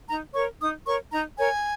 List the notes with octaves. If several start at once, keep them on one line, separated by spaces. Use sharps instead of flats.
D#4 A#5
A#4 C#5 C#6
D#4 D#6
A#4 C#5 C#6
D#4 A#5
A#4 C#5 G#5